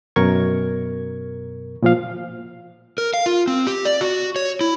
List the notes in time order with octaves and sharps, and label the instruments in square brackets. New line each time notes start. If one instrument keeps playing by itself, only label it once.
[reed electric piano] F#2 B2 A#4 C#6 G#6
A#2 F3 F5
[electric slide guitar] A#4
F5
F4
C4
G4
D5
F#4
C#5
E4